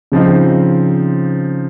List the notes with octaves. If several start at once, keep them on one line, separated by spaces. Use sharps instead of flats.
C#3 F3 C4 D#4